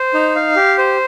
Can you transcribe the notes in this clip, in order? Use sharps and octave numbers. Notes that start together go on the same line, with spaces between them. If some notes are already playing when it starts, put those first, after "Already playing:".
Already playing: C5
D#4
F5
G4
C5